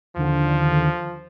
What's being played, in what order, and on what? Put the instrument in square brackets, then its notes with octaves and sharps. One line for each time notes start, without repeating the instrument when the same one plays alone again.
[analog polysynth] D#2 D3 [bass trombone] F3